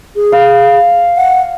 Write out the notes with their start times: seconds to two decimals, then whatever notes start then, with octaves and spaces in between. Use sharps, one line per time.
0.16 G#4
0.32 F5
1.17 F#5